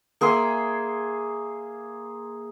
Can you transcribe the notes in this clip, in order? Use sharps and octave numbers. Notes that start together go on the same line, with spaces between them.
A#3 G#4 E5 C6